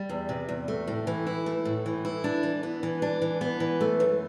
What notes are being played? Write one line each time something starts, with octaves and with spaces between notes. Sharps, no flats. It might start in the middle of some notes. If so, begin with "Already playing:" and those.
Already playing: G3
E2
C3
E2
A3
A2
E3
E4
A3
A2
E3
E4
D4
E3
B3
E3
D4
E3
B3
E3
A3
F#2